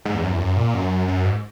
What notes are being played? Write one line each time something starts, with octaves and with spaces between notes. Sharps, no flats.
G#2
E2
F#2
E2
F#2
A#2
F#2
F#2
G#2